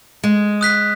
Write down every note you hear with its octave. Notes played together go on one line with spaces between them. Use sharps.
G#3
D#6 F#6 B6